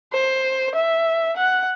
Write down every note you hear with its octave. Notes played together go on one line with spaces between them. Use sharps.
C5
E5
F#5